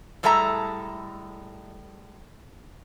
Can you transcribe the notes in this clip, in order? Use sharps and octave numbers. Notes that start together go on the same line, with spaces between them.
A2 G3 G#3 A4 E5 A#5